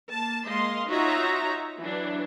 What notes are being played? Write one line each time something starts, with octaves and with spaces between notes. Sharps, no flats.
A#3 A5
G#3 A#3 D#5 F5 C6
D#4 F4 F#4 C#5 E5 A#5
E3 F#3 D4